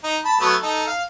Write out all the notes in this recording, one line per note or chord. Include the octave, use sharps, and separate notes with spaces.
D#4
A5 B5
F#3 A3 B3
D#4 A4
F5